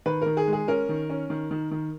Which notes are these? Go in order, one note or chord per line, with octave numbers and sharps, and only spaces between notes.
D#3 B4
D#3 A#4
G#4
G#3
G#4
C#4 A#4
D#3
C#4
D#3
D#3
D#3